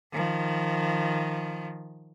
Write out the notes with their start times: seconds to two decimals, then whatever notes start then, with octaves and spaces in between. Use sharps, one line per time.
0.12 D#3 F3